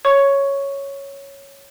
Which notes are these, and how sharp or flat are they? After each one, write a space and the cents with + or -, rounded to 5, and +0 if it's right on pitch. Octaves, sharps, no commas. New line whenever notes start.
C#5 +0 C#6 +0